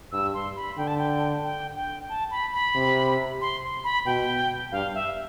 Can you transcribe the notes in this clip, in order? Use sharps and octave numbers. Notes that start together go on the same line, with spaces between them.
G2 E6
C6
B5
D3 G5
A5
G5
G5
G5
A5
B5
B5
C3
C6
B5
B2 G5
G2 F5
E5